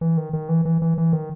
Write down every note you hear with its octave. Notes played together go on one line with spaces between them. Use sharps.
E3
D#3
D#3
E3
E3
E3
E3
D#3